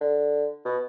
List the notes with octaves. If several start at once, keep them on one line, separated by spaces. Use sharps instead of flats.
D3
B2